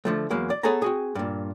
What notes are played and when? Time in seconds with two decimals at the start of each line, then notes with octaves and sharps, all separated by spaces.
0.05 D3 F3 A3
0.30 E2 F#3 G#3 A#3
0.50 D5
0.63 B3 G#4 A4 C#5 G#5 A#5
0.82 C4 F#4 G#4
1.15 G2 A#2